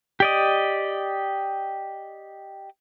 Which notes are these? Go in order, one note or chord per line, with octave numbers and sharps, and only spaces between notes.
G4 D5 D#5